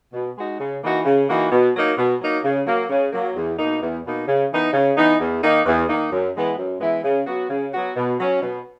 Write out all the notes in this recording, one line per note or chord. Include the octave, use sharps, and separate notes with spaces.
B2
G#3 D#4 F#4
C#3
E3 A#3 D#4 F#4
C#3
E3 A#3 D#4 F#4
B2
F#3 A#3 D#4
B2
F#3 A#3 D#4
C#3
F#3 A#3
C#3
F#3 A#3
E2
B2 A#3 D#4
E2
B2 A#3 D#4
C#3
E3 B3 D#4
C#3
E3 B3 D#4
E2
D#3 A#3 D#4
E2
D#3 A#3 D#4
F#2
E3 G#3 B3 E4
F#2
E3 G#3 B3 E4
C#3
F#3 B3 F#4
C#3
F#3 B3 F#4
B2
F#3 C#4
B2